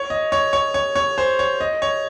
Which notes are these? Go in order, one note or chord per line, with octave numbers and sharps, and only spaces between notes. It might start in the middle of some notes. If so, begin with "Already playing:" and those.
Already playing: C#5
D#5
C#5
C#5
C#5
C#5
C5
C#5
D#5
C#5